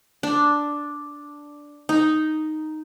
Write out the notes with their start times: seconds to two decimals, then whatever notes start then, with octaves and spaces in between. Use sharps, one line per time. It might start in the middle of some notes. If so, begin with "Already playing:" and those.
0.23 D4
1.89 D#4